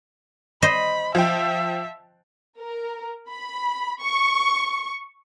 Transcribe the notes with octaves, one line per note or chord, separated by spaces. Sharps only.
C5 D#5 B5
F3 E5 G5
A#4
B5
C#6